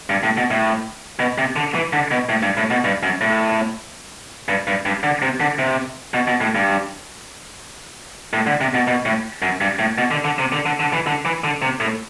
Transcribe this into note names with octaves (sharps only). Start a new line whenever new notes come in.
G2
A2
B2
A2
B2
C3
D3
E3
D3
B2
A2
G2
A2
B2
G2
F#2
A2
G2
G2
G2
D3
C3
D3
C3
B2
B2
A2
G2
A2
D3
C3
B2
B2
A2
F#2
G2
A2
B2
D3
D3
C3
D3
D3
D3
E3
D3
E3
D3
C3
A2